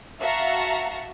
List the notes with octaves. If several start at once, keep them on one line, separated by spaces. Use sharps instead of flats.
F#4 E5 F5 A5 A#5 C#7